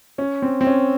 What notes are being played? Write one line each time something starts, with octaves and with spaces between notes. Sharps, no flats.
C#4
C4
C4
C#4